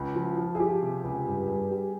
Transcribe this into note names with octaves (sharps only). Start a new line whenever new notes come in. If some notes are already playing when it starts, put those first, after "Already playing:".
Already playing: C#2
F3
F3
G#4
F3 G4
C3
C#2
G2
G2
G3